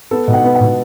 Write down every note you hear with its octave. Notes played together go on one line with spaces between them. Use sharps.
B3 A4
B2
F#5
B3
F#5
B2